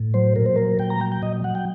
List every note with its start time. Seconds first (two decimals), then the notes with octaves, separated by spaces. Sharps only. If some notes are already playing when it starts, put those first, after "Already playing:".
Already playing: A2
0.14 F#3 C5
0.36 A#2 A#4
0.46 C5
0.56 F#3 A#4
0.79 A#2 G5
0.90 A#5
1.00 F#3 G5
1.12 G5
1.22 A#2 D#5
1.44 F#3 F#5
1.55 G5